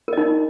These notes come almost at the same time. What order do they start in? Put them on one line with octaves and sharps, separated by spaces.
A#4 D#5 D#4